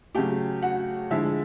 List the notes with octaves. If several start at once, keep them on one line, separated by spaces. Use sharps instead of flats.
C#3 F#3 A3 G4 G5
F#4 F#5
D3 F3 G#3 E4 E5